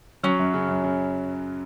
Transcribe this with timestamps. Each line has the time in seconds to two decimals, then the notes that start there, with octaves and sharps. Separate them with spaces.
0.23 F#3 C#4
0.39 F#2
0.54 C#3
0.69 F#2
0.84 C#3